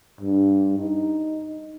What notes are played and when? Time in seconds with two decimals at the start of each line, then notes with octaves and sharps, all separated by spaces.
0.21 G2
0.78 D#4